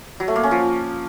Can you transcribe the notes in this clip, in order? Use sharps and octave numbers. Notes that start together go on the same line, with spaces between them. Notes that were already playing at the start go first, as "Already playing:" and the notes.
F#3
A3
A#3
C#4
F3